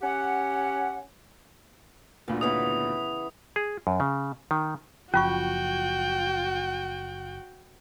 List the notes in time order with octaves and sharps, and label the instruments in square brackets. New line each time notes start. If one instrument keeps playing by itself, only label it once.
[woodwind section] C#4 G4 F#5
[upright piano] D2 A#2 D3 [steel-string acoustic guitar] B3
[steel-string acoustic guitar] C#3 E3 B3 [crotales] D#6
[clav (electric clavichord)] G#4
F#2
C#3
D#3
[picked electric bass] F#1 F3 [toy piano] C#4 F4 C#6 [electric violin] F#4 G5